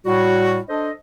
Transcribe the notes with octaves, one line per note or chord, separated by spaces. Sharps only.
A2 G3 F#4
D4 A4 C5 D#5